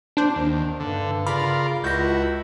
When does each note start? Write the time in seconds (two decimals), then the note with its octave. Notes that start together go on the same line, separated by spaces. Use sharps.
0.17 D4 C5
0.36 D#2
0.80 G2 D3
1.27 C#3 F4 A#4 D5 B5
1.84 C#2 E4 F#4 G6 A#6